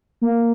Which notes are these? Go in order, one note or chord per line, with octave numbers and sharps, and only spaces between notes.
A#3